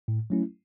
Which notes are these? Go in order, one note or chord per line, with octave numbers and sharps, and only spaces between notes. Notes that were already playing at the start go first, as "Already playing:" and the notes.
A2
F#3 A3 C#4 E4